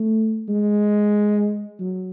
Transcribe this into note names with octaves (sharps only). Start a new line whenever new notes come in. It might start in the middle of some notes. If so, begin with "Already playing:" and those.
Already playing: A3
G#3
F#3